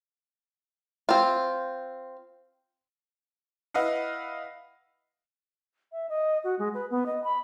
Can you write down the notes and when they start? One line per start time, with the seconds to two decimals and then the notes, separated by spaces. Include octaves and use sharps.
1.09 C4 F4
3.74 E4 B4 D#5 F5 F#5
5.92 E5
6.09 D#5
6.44 F#4
6.59 G#3
6.74 B4
6.90 B3
7.06 D#5
7.24 B5